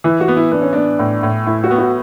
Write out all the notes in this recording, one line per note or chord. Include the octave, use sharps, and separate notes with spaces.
E3 E4
F#4
B3
E4
B3 D4
C#4
B3 D4
A2
A2
A2 E4
F#4
B3
F#4